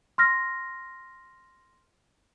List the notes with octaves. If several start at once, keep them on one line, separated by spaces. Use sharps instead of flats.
C6 F6 A#6